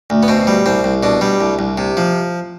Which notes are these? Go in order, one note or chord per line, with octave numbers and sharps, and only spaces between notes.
D2
B3
B2 C4
G3
C2 C4
C2
B2 D4
G3
C2
C2
C3
F3